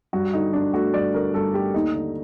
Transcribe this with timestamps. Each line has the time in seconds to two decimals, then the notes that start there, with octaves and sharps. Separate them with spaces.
0.13 G2 F#4
0.33 D3 D#4
0.53 G2 D4
0.73 A3 F#4
0.94 G2 D5
1.14 D3 A#4
1.34 G2 A4
1.54 A3 G4
1.74 D#2 D#4
1.94 D3